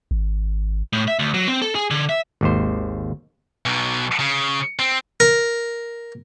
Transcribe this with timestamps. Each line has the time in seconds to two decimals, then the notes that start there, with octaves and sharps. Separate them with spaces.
0.11 G#1
0.93 A2
1.08 E5
1.19 D2
1.34 F#3
1.48 C4
1.62 A4
1.75 G#4
1.91 D3
2.09 E5
2.41 G#1 D#2 C5
3.66 B1 B2
4.20 C#3
4.79 C4
5.20 A#4